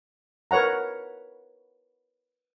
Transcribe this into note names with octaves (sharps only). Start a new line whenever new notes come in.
A#4 B4 C#5 F#5 A#5